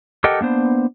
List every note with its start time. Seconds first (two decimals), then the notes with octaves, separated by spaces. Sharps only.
0.24 G4 A4 A#4 D#5 F#5 G5
0.41 A#3 B3 D4 C5